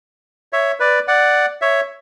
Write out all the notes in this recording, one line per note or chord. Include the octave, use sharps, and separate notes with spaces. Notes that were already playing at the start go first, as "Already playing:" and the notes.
C#5 E5
B4 D5
D5 F#5
C#5 E5